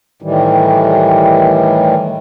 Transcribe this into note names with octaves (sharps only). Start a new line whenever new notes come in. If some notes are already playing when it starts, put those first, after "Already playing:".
A2 D#3 E3 G3